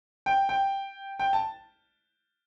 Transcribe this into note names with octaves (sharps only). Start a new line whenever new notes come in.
G5
G5
G5
A5